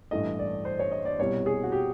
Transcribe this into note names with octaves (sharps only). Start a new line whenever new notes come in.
A1 G2 E3 A3 D#5
D5
C5
C#5
D#5
D5
C2 B2 G3 C#5
G#4
F#4
G4